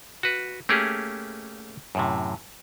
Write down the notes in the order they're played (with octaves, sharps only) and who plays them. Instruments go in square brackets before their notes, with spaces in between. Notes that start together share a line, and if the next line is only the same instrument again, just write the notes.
[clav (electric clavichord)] F#4 B4
A3 A#3 C#4 G4 G#4
F#2 A2 C3